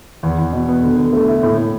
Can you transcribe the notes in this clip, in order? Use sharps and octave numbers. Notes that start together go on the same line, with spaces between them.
E2
E2
B2
B3
D3
D3
A3
E4
A2
A2